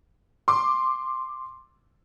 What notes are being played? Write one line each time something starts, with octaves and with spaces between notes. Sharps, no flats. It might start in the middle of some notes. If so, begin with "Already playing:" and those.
C6 D6